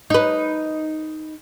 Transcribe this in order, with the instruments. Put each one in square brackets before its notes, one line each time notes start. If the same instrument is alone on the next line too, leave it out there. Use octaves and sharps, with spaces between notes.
[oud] D#4 B4